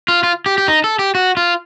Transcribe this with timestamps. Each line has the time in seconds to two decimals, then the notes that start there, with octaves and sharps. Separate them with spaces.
0.08 F4
0.23 F4
0.46 G4
0.58 G4
0.68 D#4
0.84 A4
0.99 G4
1.15 F#4
1.37 F4